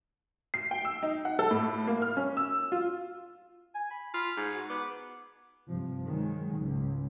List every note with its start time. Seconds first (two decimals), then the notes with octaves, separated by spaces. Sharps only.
0.54 C7
0.71 G5
0.85 E6
1.03 D#4
1.25 F#5
1.39 A4
1.51 A2
1.87 A#3
2.02 F6
2.17 C#4
2.37 E6
2.72 F4
3.75 G#5
3.91 B5
4.14 F4 B5
4.37 G#2
4.55 F#4
4.70 B3 D6
5.70 G2 C3 F3
6.06 D#3 F#3 G#3
6.59 C#2 G#2